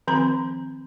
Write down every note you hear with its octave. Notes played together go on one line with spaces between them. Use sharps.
D#3 F3 C4 C5 A#5 B5